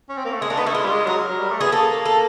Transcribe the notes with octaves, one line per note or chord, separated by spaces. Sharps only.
C#4
C4
A#3
A3
G#3 G#4
A#3 D4
B3 D#4
A3 E4
G#3 F4
G3
G#3
F#3 A#4
F#3
G3
A3
B3 G#4
A#3 A4
A4